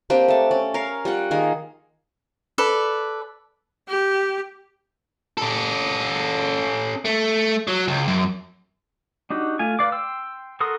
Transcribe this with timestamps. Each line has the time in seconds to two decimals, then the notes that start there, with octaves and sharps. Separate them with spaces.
0.10 A#3 C4 D4 G4
0.28 A3 A5
0.51 C#4 D5
0.74 A#4 C#5 F5
1.05 G3 F4 F#5
1.31 D#3 A#3 G#4
2.58 A4 B4 D5
3.88 G4
5.37 C#4 A4
7.05 A3
7.67 F#3
7.88 C#2
8.08 F#2
9.30 D4 D#4 F#4 G4
9.59 A3 F4 G#5
9.79 B4 D5 F5 D6
9.92 G5 C6 E6
10.60 F#4 A4 A#4 C6 D#6